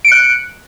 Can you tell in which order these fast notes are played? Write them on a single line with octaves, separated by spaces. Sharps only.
D7 C#7 F#6